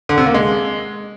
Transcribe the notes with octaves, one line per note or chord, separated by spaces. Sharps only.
D3
C3
A#3
G#3